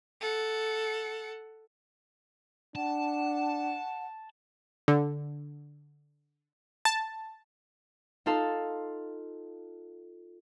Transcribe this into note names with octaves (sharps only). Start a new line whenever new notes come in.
A4 F#5
D4 F#5 A5
D3
A5
D#4 F4 A4 F5 A5 C6